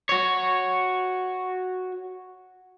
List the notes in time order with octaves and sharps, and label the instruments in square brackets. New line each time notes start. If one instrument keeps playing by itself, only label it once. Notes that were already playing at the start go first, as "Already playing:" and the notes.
[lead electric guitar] F#4 C#5